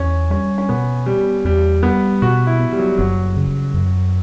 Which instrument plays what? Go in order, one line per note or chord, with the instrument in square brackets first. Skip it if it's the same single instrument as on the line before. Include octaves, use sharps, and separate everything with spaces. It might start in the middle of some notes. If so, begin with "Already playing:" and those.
Already playing: [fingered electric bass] E2 [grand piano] C#4
[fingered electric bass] G3 [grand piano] C#4
[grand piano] C#4
[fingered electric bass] B2 [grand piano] B3
[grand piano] G3 [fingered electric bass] B3
[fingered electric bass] E2 [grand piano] G3
[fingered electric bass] G3 [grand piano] B3
[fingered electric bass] B2 [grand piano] F#4
[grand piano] E4
[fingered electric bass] B3
[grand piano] G3
F#3
G3
[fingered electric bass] F#1 [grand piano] F#3
[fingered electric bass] C#3
F#2